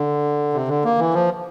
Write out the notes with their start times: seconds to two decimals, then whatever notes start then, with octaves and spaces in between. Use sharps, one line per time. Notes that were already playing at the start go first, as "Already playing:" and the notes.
Already playing: D3
0.54 C3
0.68 D3
0.84 A#3
0.99 E3
1.14 F3